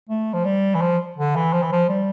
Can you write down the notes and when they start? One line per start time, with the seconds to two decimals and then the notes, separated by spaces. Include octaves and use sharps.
0.09 A3
0.33 F3
0.45 G3
0.75 E3
0.81 F3
1.17 D3
1.36 E3
1.53 F3
1.63 E3
1.72 F3
1.89 G3